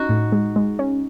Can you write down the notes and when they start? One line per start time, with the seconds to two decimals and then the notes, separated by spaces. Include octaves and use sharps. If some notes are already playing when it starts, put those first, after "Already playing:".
Already playing: C#4 D#4 F#4
0.09 A2
0.32 G#3
0.56 G#3
0.79 C#4